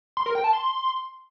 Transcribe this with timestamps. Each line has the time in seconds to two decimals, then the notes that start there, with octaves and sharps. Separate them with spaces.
0.17 C6
0.26 A#4
0.35 G5
0.44 A5
0.53 C6